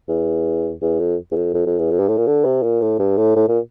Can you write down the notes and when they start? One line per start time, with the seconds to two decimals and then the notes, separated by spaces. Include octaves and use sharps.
0.09 E2
0.82 E2
0.99 F2
1.32 E2
1.36 F2
1.54 F2
1.66 F2
1.79 E2
1.91 F2
2.00 G2
2.08 A2
2.18 A#2
2.27 D3
2.45 C3
2.63 A#2
2.82 A2
2.99 G2
3.17 A2
3.36 A2
3.48 A#2